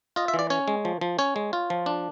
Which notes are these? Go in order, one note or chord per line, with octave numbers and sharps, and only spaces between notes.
F4 D#5
E5
E3
D5
C#4 C#5
G#3
F3
F3
C#4 C#5
G#3
F4
F3
D4